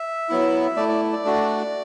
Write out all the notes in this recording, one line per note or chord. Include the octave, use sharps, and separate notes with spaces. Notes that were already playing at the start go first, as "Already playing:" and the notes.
Already playing: E5
F#3 B3 E4
A3 E4 D5
D5
D5
A3 D4 F#4